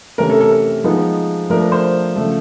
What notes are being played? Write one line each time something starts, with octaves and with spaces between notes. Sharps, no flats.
C3 E3 A3 C#4 A#4
A4
A4
A#4
F3 G#3 B3 D#4
F3 A3 D4 A#4
A#4
C5
C#3 F3 A3